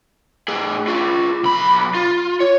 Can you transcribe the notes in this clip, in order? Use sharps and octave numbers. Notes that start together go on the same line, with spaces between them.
A2 G#4
F4 G#4
B1 B5
F4
C#5